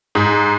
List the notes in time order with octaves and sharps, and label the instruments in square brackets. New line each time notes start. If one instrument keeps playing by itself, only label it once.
[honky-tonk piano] G#2